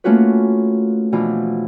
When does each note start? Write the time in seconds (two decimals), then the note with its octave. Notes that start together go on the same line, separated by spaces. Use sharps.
0.04 A3 A#3 C#4 F4 F#4 B4
1.12 B2 E3 F3 D4 F4